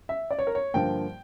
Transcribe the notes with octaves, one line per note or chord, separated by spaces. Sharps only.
E5
D5
C#5
A#4
C#5
G2 D3 F3 A#3 G5